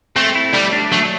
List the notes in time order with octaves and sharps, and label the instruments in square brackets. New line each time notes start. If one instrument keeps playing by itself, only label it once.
[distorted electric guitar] A3 [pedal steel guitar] C4
[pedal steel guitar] E4
[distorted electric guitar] G3 [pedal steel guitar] A3
[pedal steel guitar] D4
[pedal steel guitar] F#3 [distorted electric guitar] A3